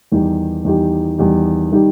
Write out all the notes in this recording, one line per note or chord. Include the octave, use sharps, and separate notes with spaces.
E2 D#3 G3 D#4 G4
E2 D#3 G3 D#4 G4
E2 D#3 G3 D#4 G4
D#3 G3 D#4 G4